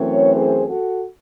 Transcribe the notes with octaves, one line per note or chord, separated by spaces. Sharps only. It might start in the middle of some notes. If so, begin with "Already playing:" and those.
Already playing: F#2 E3 A3 C4 A4 C#5
G#4 C5
F#4 A4